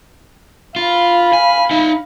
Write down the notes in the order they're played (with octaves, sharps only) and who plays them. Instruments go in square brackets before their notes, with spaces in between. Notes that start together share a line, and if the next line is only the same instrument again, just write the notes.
[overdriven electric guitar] F4 [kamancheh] F5 B5
[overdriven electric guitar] G#5
D#4 E5